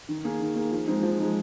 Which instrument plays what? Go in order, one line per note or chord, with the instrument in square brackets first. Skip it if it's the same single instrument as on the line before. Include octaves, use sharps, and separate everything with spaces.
[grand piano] D#3
A#3 G#4
D#3
A#3 G#4
F3
G#3 C4 D#4
F3
G#3 C4 D#4